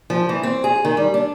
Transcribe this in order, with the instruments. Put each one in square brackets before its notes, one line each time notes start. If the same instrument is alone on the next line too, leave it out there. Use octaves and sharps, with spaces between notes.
[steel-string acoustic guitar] F3
E3
C4
G#4
D#3
G3
D4